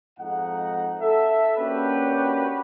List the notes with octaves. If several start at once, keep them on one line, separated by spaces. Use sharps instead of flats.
F2 G#2 D#4 F#5
A4 E5
A#3 C#4 D4 F#4 G4 B4